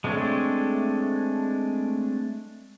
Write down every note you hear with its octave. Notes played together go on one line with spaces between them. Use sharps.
G#3 A3 C4 D4 C#5